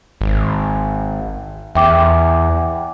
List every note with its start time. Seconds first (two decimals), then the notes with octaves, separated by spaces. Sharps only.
0.21 G#1
1.75 E2 E5 G5 D6